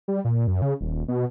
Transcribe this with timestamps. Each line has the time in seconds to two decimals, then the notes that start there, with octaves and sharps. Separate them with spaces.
0.08 G3
0.25 A#2
0.47 F#2
0.62 C#3
0.81 D#1
1.08 B2